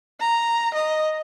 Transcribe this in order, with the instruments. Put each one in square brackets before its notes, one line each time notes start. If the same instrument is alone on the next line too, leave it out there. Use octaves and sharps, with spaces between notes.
[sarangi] A#5
D#5